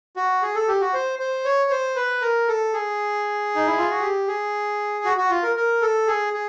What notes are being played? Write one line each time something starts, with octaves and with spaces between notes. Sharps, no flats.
F#4
G#4
A4
G4
F#4
C5
C5
C#5
C5
B4
A#4
A4
G#4
D#4
E4
F4
F#4
G4
G#4
F#4
F#4
F4
A#4
A#4
A4
G#4
G#4